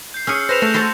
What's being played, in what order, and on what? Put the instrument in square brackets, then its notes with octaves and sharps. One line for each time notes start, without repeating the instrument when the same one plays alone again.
[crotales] G6 C7
[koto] C#4 G#4 [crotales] E6 F6 C#7
[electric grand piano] B4 C5 [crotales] A#6 E7 F7
[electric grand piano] A3 [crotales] F#6 G6
[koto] F#4 C5 A5